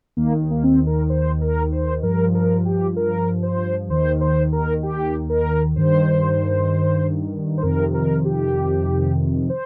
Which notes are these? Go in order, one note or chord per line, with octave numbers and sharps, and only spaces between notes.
D#2 D#3 A#3
A#3
C4
A#4
C5
A#4
C5
G2 F3 A#4
A#4
G4
A#4
C5
D#2 D#3 C5
C5
A#4
G4
A#4
G2 D#3 C5
C5
F2 C3 D#3 A#4
A#4
G4
C5